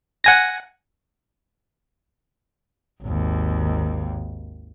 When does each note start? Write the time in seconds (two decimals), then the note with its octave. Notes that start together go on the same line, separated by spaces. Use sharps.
0.24 F#5 G#5 A#6
3.03 G#1 D#2